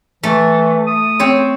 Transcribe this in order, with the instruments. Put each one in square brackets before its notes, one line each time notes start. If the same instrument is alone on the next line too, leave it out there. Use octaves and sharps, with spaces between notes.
[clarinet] E3 [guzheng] A3
[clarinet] D#6
[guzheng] C4 C5 C#5